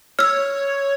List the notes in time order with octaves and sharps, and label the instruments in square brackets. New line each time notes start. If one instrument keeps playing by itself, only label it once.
[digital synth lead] C#5 [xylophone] E6 F6